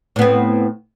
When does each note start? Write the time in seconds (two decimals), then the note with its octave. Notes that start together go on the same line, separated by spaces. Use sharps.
0.16 A2
0.19 B3
0.22 C4